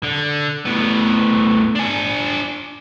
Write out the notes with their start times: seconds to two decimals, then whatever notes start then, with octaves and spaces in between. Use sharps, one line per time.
0.04 D3
0.65 A2 B3
1.76 D4 G#5